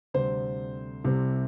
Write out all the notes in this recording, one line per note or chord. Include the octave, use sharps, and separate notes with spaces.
D2 C3 G3 C4 C5
C2 C3 G3 C4